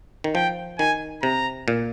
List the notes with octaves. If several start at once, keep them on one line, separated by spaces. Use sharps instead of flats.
D#3
F3 G5
D#3 G#5
C3 A#5
A#2